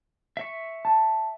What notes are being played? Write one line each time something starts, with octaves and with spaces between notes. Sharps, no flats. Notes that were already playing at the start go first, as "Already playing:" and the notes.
E5 C#6
A5